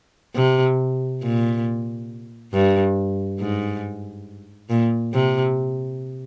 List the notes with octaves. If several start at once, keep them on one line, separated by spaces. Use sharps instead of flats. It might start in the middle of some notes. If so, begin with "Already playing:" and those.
C3
A#2
G2
G#2
A#2
C3